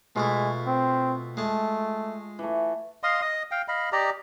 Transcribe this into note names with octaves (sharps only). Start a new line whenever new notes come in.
B2 G#3 A3 E4 F4 C#6
C4
G#3 A3 A5
E3 A3
D#5 F5 C6 D#6
D#5 D#6
F5 G5
D#5 F5 B5
G4 D5 D#5 A#5